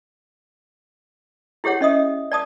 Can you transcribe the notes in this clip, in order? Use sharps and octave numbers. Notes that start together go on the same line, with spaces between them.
E4 G4 G#4 C#5 F#5
C#4 D#5 E5 D#6
D5 A5 D#6